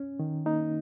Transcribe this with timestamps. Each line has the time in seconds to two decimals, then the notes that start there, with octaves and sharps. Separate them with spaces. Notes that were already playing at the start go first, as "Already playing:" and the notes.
Already playing: C#4
0.19 D#3
0.46 A#3 D#4